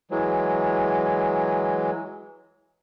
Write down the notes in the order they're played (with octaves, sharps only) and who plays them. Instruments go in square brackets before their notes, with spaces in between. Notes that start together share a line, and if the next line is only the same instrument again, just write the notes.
[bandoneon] E3 F#3 G#3